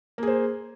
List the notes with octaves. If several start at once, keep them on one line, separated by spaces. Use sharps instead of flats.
A#3 G#4 C5